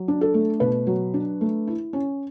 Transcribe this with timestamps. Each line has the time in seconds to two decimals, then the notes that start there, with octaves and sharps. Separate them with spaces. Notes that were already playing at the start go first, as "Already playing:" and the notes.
Already playing: F#3
0.08 D4
0.21 A4
0.34 A3
0.60 B2 B4
0.87 F#3
1.14 D4
1.41 A3
1.67 E4
1.93 C#4